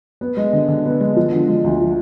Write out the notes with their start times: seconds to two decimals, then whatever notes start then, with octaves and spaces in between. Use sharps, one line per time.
0.21 B3
0.37 G#3
0.53 D3
0.68 D3
0.85 B3
1.00 G#3
1.16 F3
1.32 D3
1.48 G#3
1.64 D2
1.80 F3